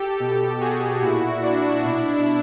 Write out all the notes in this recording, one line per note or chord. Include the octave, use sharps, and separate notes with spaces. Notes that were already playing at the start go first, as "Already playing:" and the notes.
Already playing: G4 A4
B2
F#4 G#4
A#2 E4 F#4
D4 E4
B2